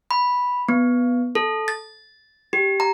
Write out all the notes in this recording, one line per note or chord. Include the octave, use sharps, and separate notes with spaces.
B5
B3
A4
A6
G4
A#5